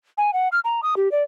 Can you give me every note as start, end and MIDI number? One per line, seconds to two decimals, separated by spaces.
0.18 0.33 80
0.33 0.49 78
0.52 0.60 89
0.64 0.81 82
0.83 0.95 87
0.97 1.11 67
1.12 1.23 74